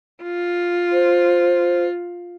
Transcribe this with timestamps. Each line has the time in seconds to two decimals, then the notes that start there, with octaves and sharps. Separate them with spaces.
0.23 F4
0.93 C5